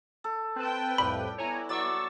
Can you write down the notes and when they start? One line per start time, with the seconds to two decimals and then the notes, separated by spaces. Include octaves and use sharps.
0.24 A4
0.56 C4 B4 G5 A5
0.98 C2 F2 A2 G3 B5
1.38 B3 E4 C#5 G#5 A#5
1.69 F#3 D5 C#6 E6 A6